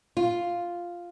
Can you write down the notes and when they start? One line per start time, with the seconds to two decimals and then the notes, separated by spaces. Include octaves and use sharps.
0.17 F4